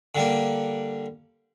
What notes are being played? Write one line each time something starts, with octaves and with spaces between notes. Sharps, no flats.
D3 G3 A#3